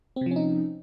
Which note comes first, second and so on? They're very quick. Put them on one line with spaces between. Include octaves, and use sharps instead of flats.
C4 C3 F3 C#4 D#4